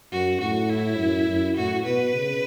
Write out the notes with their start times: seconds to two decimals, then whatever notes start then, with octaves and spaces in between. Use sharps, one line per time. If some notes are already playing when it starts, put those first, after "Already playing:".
0.12 F#2 F#4
0.41 A2 F#4
0.70 E4
0.99 F#2
1.27 F#2
1.56 A2 F#4
1.85 B2 B4
2.14 C#3